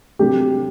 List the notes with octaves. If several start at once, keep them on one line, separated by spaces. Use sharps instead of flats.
C3 F#3 A3 D4 G4